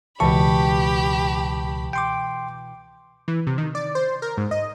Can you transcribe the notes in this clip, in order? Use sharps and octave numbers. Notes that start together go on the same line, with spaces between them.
C#2 B2 E3 G4 A5 B5 C#6
G5 C6 D6 C#7
E3
C3
D#3
D5
C5
A#4
G#2
D#5